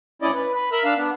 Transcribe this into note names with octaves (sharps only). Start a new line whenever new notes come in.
D2 C#4 E4 D5 D#5
B4
B4
A#4 E5 A#5 B5
D4 F5 E6
B3 D4